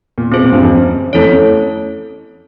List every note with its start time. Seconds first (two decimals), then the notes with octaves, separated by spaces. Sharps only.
0.18 A#2
0.31 B2 C4 F4 G#4 C5
0.43 A#2
0.52 G2
0.62 F2
0.73 F#2
1.13 F2 A3 C#4 E4 A4 C#5
1.23 F#2